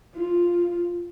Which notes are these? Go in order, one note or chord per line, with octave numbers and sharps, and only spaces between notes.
F4